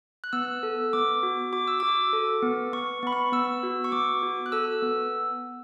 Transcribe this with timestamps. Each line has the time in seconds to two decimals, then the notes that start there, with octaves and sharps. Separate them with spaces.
0.24 F#6
0.33 B3 E6
0.63 A4
0.93 B3 D6
1.23 F#4
1.53 F#4 D6
1.67 E6
1.80 F#4 D6
2.13 A4
2.42 B3
2.73 B3 C#6
3.03 B3 B5
3.12 C#6
3.32 B3 E6
3.63 F#4
3.84 C#6
3.92 B3 D6
4.23 F#4
4.46 F#6
4.52 A4 E6
4.82 B3